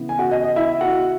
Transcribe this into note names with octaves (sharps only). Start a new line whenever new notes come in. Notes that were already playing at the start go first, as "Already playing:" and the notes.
Already playing: C#3 E3 B3
G#5
F#4 F#5
D#5
D#5
E4 E5
F#4 F#5